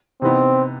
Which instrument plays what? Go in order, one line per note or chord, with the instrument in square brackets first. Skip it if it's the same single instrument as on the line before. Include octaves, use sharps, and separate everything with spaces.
[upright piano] C3 E3 B3 D#4 [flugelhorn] C4